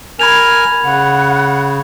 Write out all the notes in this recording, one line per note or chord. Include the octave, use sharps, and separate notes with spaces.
A#4 G#5 B5 G#6 F7
C#3 F#5